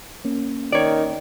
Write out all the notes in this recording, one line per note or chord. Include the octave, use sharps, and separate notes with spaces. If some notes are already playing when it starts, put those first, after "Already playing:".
A#3 C#4
D#3 C#5 D5